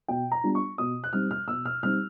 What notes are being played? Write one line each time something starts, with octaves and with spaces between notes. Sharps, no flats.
B2 G5
A#5
G3 B3 D4 F4
C#6
B2 D#6
F#6
G3 C4 D#4 F6
F6
B2 E6
F6
G3 C4 D#4 F6